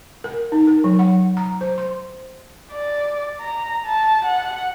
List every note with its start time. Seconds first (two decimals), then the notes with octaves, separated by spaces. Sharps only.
0.24 A#4
0.52 D#4
0.67 A#4
0.84 F#3
0.99 F#5
1.37 A#5
1.61 C5
1.78 C6
2.71 D5
3.40 A#5
3.87 A5
4.25 F#5